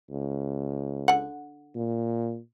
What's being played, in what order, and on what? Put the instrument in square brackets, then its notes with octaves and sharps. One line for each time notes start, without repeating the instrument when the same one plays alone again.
[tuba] C#2
[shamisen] D3 F#5
[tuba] A#2